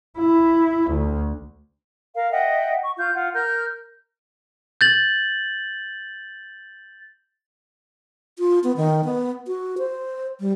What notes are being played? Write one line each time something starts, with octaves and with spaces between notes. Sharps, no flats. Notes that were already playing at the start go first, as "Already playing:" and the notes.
E4
D2
A#4 F5
D#5 E5 F#5 G5
C#6
F4 G6
F4 F#5
A#4 F6 G6
G6 A6 F#7
F4
B3
D#3
B3
F#4
C5
G3